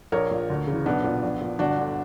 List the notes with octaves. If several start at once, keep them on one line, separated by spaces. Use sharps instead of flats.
A#1 A#4 C#5
A#2
D2
C#3
E3
B1 B3 D4
A#2
A#1
A#2
G1 D4 F#4
D3